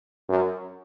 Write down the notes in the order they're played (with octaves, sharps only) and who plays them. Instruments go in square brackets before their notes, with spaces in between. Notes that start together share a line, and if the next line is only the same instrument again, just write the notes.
[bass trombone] F#2